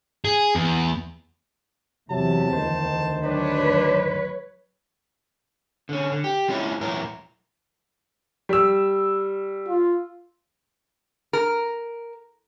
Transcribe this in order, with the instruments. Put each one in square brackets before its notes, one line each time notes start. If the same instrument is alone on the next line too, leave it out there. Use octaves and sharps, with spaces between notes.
[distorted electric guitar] G#4
E2
[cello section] E2 [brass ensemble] C3 [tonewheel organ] F#3 [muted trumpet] A5
[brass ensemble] D2 D#3 [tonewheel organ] C5
[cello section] F#3 B4 C#5 [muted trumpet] D4
[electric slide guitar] D3 C#4
D3
G4
F3 G#3 C#4 D#4 E4
E2 A#2 F#3 E4 A#4
[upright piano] G3 E6
[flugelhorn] F4
[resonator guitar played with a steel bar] A#4